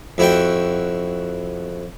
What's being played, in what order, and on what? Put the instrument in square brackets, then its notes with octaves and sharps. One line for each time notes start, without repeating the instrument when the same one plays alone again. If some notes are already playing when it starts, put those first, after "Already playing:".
[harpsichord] F2 E4 F#4 G5